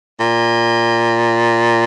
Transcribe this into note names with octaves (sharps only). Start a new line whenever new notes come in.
A#2